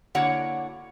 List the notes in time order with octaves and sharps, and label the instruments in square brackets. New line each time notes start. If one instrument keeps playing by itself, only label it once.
[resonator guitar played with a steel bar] D3 A#3 E4 F#4 C#5 F#5